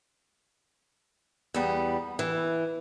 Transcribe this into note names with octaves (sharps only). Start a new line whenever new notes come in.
E2 G3 B3
E3